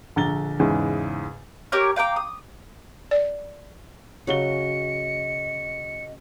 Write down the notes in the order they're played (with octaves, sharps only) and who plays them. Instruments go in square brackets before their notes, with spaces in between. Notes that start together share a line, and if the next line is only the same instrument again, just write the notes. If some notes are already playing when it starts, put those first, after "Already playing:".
[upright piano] A#1 D3 A#5 A6 G7
E2 G#2 C#3 E3
[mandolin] G4 A#4 C#5 F6
F5 G5 A#5 D6
D#6
[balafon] D5
[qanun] C#3 F#3 [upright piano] F#4 G7 [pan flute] D#5 [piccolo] C#7